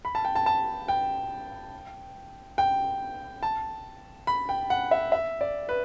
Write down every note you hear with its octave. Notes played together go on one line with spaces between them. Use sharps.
B5
A5
G5
A5
A5
G5
G5
A5
B5
G5
F#5
E5
E5
D5
B4